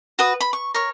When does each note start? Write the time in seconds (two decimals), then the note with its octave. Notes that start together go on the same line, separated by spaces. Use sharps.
0.19 F#4 B4 D#6
0.40 B5
0.53 C#6
0.74 A#4 C#5